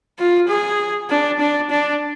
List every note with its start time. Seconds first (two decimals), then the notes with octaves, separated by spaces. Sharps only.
0.19 F4
0.48 G#4
1.10 D4
1.40 D4
1.70 D4